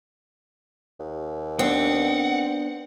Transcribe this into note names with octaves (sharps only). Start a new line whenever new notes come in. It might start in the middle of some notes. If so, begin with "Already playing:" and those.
D#2
B3 C4 D4 F#5